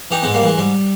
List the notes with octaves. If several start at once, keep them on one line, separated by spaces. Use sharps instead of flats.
E3 D#4 G4
G#2 G#3 B3
G3 A#3
E3 G#3
G#2 G3